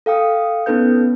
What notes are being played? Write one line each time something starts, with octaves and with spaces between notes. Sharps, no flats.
A4 F5 G5 D#6
B3 C#4 D#4 A4 B4 G6